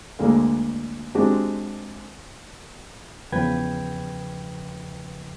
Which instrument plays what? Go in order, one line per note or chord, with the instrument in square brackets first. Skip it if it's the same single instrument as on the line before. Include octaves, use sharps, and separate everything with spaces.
[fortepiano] D2 D3 G#3 A#3
G#3 C4 D4 F#4 G4
[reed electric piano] E2 C#3 F3 B4 G5 G#6